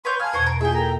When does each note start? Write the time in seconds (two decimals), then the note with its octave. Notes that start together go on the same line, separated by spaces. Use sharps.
0.05 B4 C#5 C6 G6
0.20 F5 G#5 A5 F6 G#6
0.33 E2 B2 B3 C5 C#6
0.46 A#4
0.61 A#3 E4 F4 G#4 E5 G5
0.74 A4 A#4 A#5